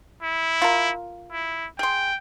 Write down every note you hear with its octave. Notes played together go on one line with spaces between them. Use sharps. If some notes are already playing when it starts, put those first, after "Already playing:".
E4
F4 A#4
E4
G#4 G5 C6